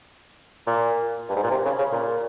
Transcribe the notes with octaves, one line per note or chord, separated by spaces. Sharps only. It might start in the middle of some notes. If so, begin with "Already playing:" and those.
A#2
G2
G#2
A#2
C3
C#3
C#3
A#2